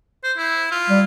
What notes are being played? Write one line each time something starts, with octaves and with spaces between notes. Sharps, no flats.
C5
E4
F4
G3